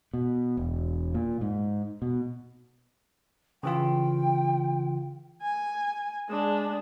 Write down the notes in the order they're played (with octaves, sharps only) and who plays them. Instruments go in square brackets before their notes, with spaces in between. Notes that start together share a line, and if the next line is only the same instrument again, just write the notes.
[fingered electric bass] B2
E1
A#2
G#2
B2
[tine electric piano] C#3 E3 F4 [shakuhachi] G5
[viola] G#5
G#3 D4